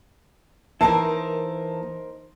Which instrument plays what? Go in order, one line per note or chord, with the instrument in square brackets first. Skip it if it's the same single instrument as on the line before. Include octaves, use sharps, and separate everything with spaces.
[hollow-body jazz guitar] E3 A#3 E4 [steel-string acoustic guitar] D#4 A#4 C5 [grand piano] A5